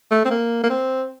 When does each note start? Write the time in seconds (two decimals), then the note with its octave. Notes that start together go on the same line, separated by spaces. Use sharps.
0.11 A3
0.25 C4
0.31 A#3
0.64 A#3
0.70 C4